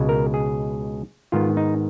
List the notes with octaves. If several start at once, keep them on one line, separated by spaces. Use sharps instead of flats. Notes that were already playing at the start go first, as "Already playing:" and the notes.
Already playing: C#2 B2 G#3
A#4
G#4
G#2 D#3 G#3 B3 F4
D#4